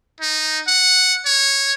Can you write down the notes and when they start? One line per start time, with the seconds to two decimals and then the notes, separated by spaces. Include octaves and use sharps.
0.21 D#4
0.67 F#5
1.26 C#5